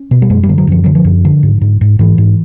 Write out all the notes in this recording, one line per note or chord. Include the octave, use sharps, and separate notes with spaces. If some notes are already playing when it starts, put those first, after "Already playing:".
Already playing: C#4
B2
G3
F#2 G#3
G3
D3
F#3
F#2 F3
D3 F#3
F3
F#2
D3
G#2
G#2
G#2
G#2 E3
G#2